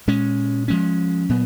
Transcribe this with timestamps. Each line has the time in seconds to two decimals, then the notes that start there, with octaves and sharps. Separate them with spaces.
0.08 A#2 G#3 C#4
0.68 F3 G#3 C#4
1.29 A#2 F#3 B3